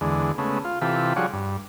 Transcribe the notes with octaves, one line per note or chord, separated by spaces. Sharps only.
E2 D3 G#3
C#3 G#3 A3 B3
F4
C3 E3 F4 G4 A4 B5
F3 G3 D4 F#4 G#4 C#5
G2